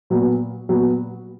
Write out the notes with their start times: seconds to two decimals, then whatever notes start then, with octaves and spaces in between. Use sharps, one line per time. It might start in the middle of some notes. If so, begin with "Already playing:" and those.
0.10 A#2 F#3 B3
0.69 A#2 F#3 B3